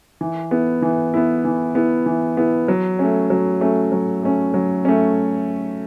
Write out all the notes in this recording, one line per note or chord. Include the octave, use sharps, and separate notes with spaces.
E3
B3 E4
E3
B3 E4
E3
B3 E4
E3
B3 E4
F#3
A3 C#4
F#3
A3 C#4
F#3
A3 C#4
F#3
A3 C#4